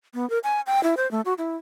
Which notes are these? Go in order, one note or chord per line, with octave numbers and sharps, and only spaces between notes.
B3
A#4
G#5
G5
E4
C5
A3
F#4
E4